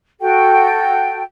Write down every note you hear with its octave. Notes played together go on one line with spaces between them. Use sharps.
F#4 A4 G5